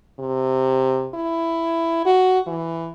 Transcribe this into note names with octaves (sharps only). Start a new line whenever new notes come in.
C3
E4
F#4
E3